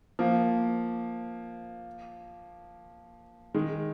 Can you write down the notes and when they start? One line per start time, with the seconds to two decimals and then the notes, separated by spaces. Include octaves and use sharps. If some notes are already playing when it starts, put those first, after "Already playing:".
0.19 F3 A#3
3.54 D#3 G#3